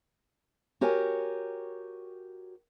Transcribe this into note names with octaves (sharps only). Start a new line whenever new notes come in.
F#4 G4 A#4 C#5 G#5